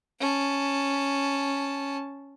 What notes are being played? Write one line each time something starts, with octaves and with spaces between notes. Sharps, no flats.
C#4 A5